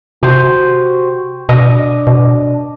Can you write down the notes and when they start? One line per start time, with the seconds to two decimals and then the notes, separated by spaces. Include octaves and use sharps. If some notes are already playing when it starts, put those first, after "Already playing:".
0.23 C3 F#4 G4 C5
1.49 B2 D4 D#5
2.07 B2